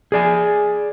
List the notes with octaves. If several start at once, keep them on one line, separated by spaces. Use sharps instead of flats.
G#4 D5 G#5